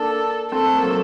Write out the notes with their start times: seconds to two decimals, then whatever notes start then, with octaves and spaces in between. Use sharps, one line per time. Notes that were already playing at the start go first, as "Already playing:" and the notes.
Already playing: A#3 D4 A4
0.52 A3 C4 A4
0.75 A#3
0.82 F#3 A3